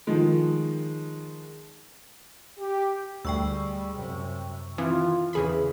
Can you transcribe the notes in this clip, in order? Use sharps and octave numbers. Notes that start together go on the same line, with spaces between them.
D#3 F3 G#3
G4
D2 G3 G#3 G5 C#6 E6
F#2 C3
D#3 E3 C4 F4
E2 C#3 E3 G#4 B5